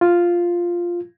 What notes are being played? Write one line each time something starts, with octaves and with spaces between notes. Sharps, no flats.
F4